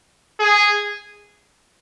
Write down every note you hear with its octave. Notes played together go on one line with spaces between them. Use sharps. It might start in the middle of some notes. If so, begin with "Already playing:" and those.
G#4